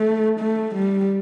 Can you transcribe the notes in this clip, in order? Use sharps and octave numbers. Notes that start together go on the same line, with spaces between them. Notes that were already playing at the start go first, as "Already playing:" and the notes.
Already playing: A3
A3
G3